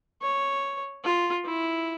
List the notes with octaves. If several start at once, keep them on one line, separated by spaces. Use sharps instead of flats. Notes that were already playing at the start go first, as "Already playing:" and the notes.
C#5
F4
E4